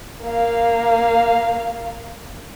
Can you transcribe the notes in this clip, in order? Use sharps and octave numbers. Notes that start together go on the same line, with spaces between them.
A#3 F5